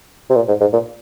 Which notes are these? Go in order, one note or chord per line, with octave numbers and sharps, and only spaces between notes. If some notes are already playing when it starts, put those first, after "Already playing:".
C3
A#2
G#2
G#2
A#2